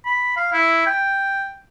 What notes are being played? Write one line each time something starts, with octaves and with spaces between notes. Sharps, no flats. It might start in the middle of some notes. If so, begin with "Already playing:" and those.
B5
F5
E4
G5